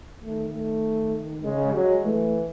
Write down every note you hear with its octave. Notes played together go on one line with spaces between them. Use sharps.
D#3 A3
A3
C#3 G#3
F#3 G#3
E3 A3